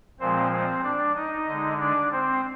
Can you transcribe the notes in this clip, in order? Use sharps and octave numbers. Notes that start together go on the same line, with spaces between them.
A#2 F3 G#3 C4 C5
C4 C5
D4 D5
D#4 D#5
D3 G#3
D4 D5
C4 C5